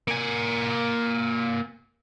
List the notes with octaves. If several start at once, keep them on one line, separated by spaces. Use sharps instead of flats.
A#3 G#5